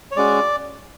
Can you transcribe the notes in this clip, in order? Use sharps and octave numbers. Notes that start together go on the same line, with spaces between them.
C#5
G#3 C#4 F#4 D5